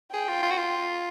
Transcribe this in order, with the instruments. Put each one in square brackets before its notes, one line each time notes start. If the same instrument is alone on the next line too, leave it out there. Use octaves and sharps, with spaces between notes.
[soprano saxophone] G#4 [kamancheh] G5
[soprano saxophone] F4
F4
F#4
F4